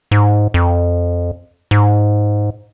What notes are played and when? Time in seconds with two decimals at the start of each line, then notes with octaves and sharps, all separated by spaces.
0.11 G#2
0.54 F2
1.71 G#2